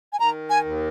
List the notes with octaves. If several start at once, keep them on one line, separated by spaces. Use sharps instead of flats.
G#5
D#3 A#5
G#5
D#2